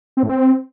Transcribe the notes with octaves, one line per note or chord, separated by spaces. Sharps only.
C4
A2
C4